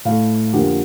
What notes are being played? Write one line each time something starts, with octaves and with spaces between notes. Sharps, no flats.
A2 A3 F5
F2 D3 F3 A#3 G4